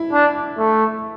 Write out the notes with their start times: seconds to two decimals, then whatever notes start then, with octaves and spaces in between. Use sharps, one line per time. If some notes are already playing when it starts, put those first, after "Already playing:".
Already playing: E4
0.13 D4
0.58 A3